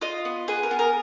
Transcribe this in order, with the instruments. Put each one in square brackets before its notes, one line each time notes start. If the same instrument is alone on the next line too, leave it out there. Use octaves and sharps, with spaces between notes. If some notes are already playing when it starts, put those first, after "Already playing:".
[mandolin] F4 D#5
B3
G#4 B4
A#4
B3
A#4